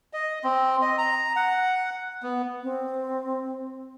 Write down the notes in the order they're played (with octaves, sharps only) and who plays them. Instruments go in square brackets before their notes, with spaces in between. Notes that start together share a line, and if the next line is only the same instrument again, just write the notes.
[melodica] D#5
C4
D#5
A#5
F#5
B3
[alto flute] C4